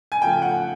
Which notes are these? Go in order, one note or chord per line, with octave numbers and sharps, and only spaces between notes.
G#5
C#3 F3 A3 G5
F#5